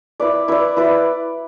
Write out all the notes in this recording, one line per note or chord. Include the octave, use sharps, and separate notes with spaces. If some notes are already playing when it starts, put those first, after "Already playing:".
E4 B4 D5
E4 B4 D5
E4 B4 D5